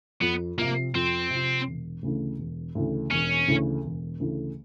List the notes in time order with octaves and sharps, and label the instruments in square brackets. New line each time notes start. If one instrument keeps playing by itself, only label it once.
[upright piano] F2 [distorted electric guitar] B3
[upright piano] C3 F3 [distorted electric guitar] A#3
[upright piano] F2 [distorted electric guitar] C4
[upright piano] C3 F3
E1
D2 C#3 E3 A3
E1
D2 C#3 E3 A3
[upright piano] E1 [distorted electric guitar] C#4
[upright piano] D2 C#3 E3 A3
E1
D2 C#3 E3 A3